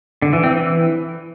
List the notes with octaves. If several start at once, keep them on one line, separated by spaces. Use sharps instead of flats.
D3
E3
C4
E3